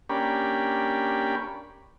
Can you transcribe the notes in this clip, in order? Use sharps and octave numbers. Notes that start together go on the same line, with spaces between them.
A#3 C#4 D4 G4 B5